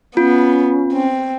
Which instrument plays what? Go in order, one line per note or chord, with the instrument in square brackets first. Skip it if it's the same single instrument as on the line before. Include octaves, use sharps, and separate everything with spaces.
[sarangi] B3 [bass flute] C#4 [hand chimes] F4
[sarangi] C4